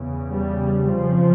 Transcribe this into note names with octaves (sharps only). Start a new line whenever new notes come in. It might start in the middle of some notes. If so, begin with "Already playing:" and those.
Already playing: E2 C#3
G3
F2 C#3 F3